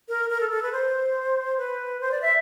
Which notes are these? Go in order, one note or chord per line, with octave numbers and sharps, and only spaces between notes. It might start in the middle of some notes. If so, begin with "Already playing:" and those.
A#4
A#4
A4
A4
B4
C5
B4
C5
D5
E5